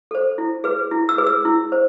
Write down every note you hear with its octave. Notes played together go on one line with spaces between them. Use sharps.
A4 C5
E4
G#4 B4
E4
E6
G#4 B4
E6
E4
C5